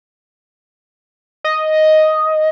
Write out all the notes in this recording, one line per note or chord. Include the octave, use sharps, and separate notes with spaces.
D#5